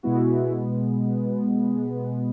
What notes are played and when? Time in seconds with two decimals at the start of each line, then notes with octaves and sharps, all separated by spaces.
0.03 B2 G#3 B3 E4 F#4